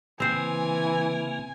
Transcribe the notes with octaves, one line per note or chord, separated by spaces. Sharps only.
C#3 E3 A#3 C4 C5 G#5